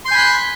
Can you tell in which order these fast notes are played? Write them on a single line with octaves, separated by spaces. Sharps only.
C6 G6 G#5 B5 F#6